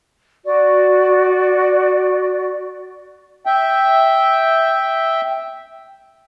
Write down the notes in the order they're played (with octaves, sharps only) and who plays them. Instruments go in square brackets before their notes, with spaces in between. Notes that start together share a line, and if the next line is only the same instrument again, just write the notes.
[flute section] F#4 D5
[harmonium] E5 G5